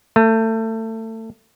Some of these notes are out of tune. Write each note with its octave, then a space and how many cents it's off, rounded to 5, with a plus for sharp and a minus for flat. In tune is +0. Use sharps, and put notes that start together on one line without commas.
A3 +25